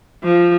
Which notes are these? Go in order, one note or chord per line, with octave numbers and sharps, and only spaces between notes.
F3